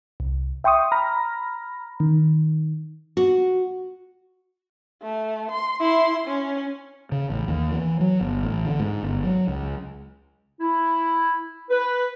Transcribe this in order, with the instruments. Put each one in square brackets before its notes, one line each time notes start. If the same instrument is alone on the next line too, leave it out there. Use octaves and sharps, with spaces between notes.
[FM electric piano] C2
E5 G5 C6 C#6 D#6
A#5 B5 F6 A#6
D#3
[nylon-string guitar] F#4
[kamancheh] A3
C6
E4 C6
C#4
[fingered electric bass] C#3
A1
D#2
E3
F#3
G1
A1
D3
G#2
G1
F#3
C#2
[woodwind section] E4
B4